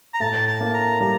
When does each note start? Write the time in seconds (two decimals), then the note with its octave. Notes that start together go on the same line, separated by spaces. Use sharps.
0.14 A#5
0.20 A2 A5
0.47 A5
0.61 A#3
0.74 A#5
1.00 G3 A#5